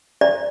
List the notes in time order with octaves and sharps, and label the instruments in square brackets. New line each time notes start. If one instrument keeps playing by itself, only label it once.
[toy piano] D5